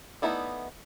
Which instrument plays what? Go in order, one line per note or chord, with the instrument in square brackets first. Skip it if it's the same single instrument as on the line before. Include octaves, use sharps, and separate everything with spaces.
[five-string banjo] A3 B3 D#4 E4 D5